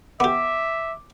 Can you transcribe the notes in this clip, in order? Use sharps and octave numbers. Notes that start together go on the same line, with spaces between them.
B3 G4 E5 D6